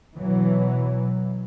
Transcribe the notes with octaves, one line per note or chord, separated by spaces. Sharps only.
B2 E3 F#3